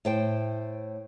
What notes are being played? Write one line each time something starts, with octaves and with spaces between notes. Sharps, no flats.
A2 C5 G5